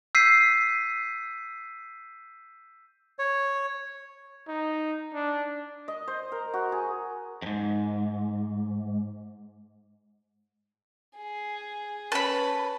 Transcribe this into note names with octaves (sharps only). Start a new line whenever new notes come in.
E6 G6 B6 C7 D#7
C#5
D#4
D4
D#5
C5
A#4
F#4
G#4
F2 G#2
G#4
C#4 B4 A5 B5